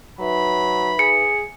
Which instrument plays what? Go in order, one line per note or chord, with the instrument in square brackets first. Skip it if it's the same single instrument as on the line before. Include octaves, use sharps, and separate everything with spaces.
[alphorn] F#3 [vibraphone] D#4 B4 E5 [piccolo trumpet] B5
[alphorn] G#4 [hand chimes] C#7